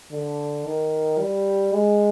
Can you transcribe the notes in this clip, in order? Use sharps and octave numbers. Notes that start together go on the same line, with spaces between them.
D3
D#3
G3
G#3